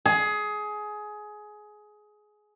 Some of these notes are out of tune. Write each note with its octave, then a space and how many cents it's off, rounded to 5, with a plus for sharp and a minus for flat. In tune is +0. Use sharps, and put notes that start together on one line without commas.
G#4 +20